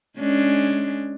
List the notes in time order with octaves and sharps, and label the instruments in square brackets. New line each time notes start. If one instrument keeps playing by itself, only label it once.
[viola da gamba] G#3 C#4 D4